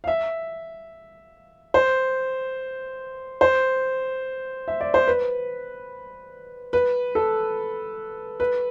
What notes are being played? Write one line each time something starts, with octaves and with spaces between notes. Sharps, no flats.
F5
E5
C5
C5
E5
D5
C5
B4
B4
A4
B4